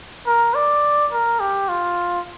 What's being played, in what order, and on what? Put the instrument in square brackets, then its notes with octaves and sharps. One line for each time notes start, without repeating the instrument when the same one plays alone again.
[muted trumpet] A#4
D5
A#4
G4
F4